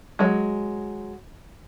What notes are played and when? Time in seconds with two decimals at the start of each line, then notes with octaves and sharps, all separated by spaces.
0.19 F#3 G#3